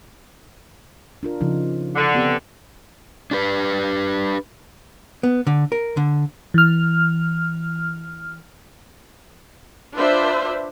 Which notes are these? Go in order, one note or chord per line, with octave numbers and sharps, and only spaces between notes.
D4 F4 A#4
C#3 F3 D#4
D3
B3 C4 G4
D4 G4 B4
B3
D3
A#4
D3
E3 F6
D4 F4 B4 C5 E5